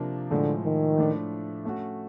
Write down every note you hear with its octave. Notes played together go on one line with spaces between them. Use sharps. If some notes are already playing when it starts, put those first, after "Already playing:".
Already playing: C3 F3 A#3 D4
A2 D3 F3 G#3
D#3
A2 F3 A3 D4
A3 C#4 F#4